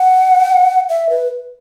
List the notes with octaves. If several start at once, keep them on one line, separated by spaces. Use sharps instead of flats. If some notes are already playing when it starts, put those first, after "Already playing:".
Already playing: F#5
E5
B4